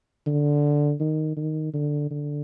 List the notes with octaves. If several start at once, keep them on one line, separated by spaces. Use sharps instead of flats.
D3
D#3
D#3
D3
D3